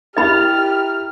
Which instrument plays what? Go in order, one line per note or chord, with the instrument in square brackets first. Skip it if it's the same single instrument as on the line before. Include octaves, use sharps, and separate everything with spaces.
[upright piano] E4 A#4 A6 [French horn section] G4 [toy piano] D#5 B5 [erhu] F6